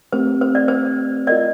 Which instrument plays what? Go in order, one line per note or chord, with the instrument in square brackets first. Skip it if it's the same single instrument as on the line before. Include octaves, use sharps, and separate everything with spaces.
[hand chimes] A3 C4 G4 A#4 [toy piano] C5
[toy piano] C5
D5
C5
[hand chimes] F4 A#4 D#5 [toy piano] D5